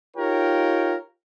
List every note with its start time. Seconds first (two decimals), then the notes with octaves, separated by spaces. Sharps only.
0.17 D#4 F4 G4 A#4 C#5 G5